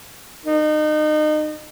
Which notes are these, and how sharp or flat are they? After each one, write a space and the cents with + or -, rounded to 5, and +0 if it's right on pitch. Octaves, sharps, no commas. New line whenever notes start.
D#4 -30